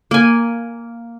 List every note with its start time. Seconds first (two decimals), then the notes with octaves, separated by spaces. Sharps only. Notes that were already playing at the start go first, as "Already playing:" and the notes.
0.11 A#3 G#5